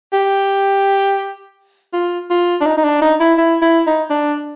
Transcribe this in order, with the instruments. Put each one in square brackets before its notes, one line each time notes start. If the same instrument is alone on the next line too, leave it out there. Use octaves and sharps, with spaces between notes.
[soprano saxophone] G4
F4
F4
D4
D#4
D#4
D4
D#4
E4
E4
E4
D#4
D4